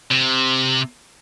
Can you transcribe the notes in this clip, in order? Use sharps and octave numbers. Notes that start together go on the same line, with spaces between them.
C3